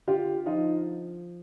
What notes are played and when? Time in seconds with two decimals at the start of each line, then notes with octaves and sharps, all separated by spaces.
0.07 D3 F4 G4
0.46 F3 D#4 F4